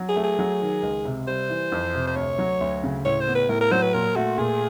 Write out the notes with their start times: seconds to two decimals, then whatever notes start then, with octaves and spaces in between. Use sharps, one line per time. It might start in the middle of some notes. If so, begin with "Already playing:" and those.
Already playing: F#3
0.09 G#4
0.16 A3
0.24 G#4
0.39 F#3
0.61 D#3
0.83 C#2
1.05 C3
1.27 G3 C5
1.50 E3
1.72 F2
1.94 C3
2.07 C5
2.16 D2 C#5
2.38 F#3
2.61 D2
2.83 C#3
3.05 A2 C#5
3.20 C5
3.28 B3
3.35 B4
3.49 A2 A#4
3.61 A#4
3.71 F#3 C5
3.82 B4
3.94 A#2 A#4
4.16 A3 F#4
4.38 A#2 G#4